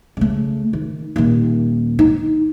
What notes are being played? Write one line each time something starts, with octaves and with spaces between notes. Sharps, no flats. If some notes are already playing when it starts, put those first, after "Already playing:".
C#3 A3
D#3
D#1 D#3
D#4